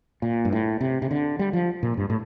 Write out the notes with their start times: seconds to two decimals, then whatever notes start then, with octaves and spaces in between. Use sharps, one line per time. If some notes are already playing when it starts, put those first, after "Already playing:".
0.22 A#2
0.45 G2
0.53 A2
0.81 C3
1.02 C3
1.11 D3
1.39 G3
1.53 F3
1.83 A#2
1.97 G2
2.10 A2